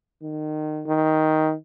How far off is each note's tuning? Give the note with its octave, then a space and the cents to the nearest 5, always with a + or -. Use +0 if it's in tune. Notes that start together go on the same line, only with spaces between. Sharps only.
D#3 -25
D#3 +10